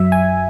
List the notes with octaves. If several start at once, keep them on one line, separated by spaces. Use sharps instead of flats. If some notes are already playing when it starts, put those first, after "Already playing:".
Already playing: F#2 F#3 E5
G#5